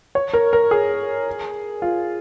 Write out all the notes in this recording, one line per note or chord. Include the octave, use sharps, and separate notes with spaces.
C#5
A#4
A#4
G#4
F4